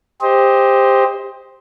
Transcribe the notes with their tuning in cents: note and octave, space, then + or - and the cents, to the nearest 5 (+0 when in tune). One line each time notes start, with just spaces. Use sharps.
G4 +20 C5 +0 D#5 +20